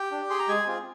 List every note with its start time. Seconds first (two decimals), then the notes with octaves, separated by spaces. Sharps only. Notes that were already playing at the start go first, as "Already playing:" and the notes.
Already playing: G4 G5
0.11 D4
0.30 G#4 C6
0.39 A#5
0.48 G#3 G#4 G#5
0.66 C4 F4 G#4